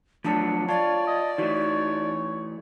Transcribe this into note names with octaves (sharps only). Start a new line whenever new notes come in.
F3 F#3 A3 B3 D4 A5 C#7
F4 C#5 D5 A5 G#6
D#5
E3 A3 D#4 F#4 C#5